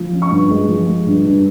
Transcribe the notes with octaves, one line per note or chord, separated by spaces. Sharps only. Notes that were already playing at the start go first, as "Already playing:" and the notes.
Already playing: F3
C#4
C#6
G2
G#3
F3
G#3
G2
G2